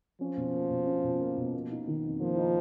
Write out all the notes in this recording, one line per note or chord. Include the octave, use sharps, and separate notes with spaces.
F3 C#4
B2
A#3
B2
C#4
B2
A#3
B2
A#3
D#4
D#3
F2
F3 A#3
D#4